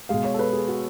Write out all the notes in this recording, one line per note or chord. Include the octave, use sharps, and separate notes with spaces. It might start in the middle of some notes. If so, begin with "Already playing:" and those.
B2 G#3 F5
C#5
A4
B4
G#4
F#4